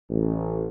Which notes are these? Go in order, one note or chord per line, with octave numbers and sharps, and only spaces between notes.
A1